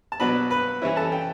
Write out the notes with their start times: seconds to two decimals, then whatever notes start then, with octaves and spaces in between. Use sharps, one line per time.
0.12 A5
0.20 B2 F#3 B3 D4 B4 B5
0.51 B4 B5
0.82 E3 G3 C#4 E4
0.97 A4 A5
1.12 G5